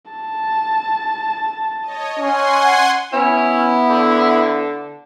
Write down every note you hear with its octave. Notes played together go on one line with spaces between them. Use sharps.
A5
C#5 D#5
C#4 F#5 G#5 C6
B3 C#4 E4
D3